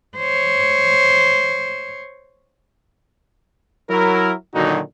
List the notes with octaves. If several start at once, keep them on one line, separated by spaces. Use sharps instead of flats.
C5 C#5
F#3 E4 A#4
A#2 D3 D#3 F#3 D#4 F#4